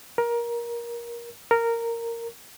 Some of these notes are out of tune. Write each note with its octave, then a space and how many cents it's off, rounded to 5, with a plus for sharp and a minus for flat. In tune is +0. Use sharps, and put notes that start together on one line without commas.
A#4 +20
A#4 -10